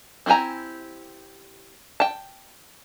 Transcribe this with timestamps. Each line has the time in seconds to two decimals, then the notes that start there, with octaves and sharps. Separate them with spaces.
0.26 C4 E4 G4 G#5 A#5
2.00 G5 A5